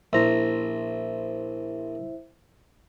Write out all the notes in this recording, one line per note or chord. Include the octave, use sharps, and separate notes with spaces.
A#1 E4 C5 E5 A#5